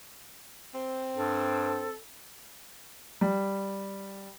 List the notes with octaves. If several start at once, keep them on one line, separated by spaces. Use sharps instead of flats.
C4
G2 A4
G3